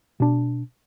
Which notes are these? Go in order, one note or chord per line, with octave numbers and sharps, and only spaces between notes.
B2 D4